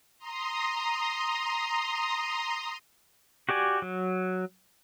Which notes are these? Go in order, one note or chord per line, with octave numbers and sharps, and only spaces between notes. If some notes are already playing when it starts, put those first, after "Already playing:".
A#5 C6 D#6
F#4 G4 D5 G#5
F#3